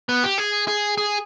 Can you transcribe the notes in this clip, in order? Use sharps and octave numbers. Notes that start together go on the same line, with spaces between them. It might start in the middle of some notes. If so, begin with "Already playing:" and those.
B3
G4
G#4
G#4
G#4